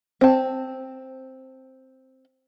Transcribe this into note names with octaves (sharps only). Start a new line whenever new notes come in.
C4 A5